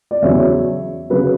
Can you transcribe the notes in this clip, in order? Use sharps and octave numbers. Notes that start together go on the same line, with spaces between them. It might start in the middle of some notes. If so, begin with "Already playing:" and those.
D5
E2 C#3 F#3 C#5 E5
C#3 F#3 B4